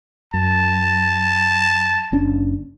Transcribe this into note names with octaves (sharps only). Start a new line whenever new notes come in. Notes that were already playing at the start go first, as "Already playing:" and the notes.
F#2 A5
F#1 C#4 D4